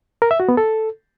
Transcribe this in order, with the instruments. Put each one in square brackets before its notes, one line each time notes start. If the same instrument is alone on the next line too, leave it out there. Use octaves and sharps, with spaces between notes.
[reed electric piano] A#4
E5
F#4
B3
A4